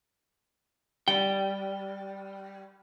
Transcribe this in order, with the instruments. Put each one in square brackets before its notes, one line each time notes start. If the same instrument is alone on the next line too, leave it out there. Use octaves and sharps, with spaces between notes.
[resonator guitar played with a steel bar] G3 [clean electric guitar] G5